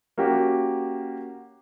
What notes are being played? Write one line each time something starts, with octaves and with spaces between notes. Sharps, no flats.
A#3 C#4 F#4 G4